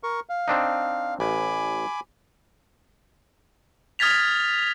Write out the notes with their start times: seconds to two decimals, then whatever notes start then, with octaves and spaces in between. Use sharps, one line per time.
0.03 A#4 C#6
0.29 F5
0.48 C4 D4 D#4
1.20 A1 G#5 B5 D6
3.99 D#6 F6 G#6 A6 B6 F7